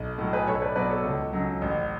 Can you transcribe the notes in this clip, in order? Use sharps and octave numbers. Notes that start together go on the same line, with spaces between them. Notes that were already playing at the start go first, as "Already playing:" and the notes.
Already playing: B1
A2 F#3
G#4 B4
B1 A4 C#5
B4 D5
B2 F#3 B4 D5
A4 C#5
C#2
C#3 F#3
A1